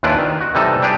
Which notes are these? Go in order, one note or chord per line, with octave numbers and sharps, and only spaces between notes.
D#2 E3 D4 E4 F4 B4
D#3
F#4
C3 E3 G3 D#4 A4
G3 D4 G4 G#4